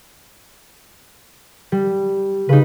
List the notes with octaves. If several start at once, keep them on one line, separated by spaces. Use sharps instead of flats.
G3
C#3 D#4 B4